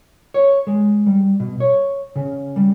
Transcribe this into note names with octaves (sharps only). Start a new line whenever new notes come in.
C#5
G#3
G3
B2
C#5
C#3
G3